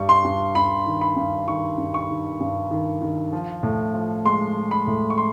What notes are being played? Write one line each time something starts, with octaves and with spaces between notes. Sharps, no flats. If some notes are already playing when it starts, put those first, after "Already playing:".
Already playing: G2 G3 C#6
C6
G2
G2 B5
D#3
B5
G2
D#3 C#6
G2
C#6
D#3
G2
D#3
D#3
F3
A2
F3
G#3 C6
G#3
B5
A2
C#6
C6